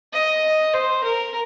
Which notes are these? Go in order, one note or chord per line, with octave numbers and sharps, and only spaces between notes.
D#5
C5
A#4